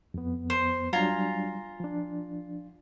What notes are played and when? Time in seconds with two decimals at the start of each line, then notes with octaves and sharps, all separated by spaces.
0.14 F2 B3
0.50 C5
0.93 F#3 G3 D4 F4 G#5 A#5
1.80 F3 D4